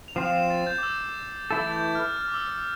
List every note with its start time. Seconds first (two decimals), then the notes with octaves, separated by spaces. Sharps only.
0.08 F7
0.16 F3 C4 F4 C7 E7
0.33 C7 E7
0.50 A6
0.67 G6
0.78 D6
0.83 E6
1.50 E3 A3 E4 A4 A6
1.72 G6
1.95 F6
2.17 F6
2.28 D6
2.34 E6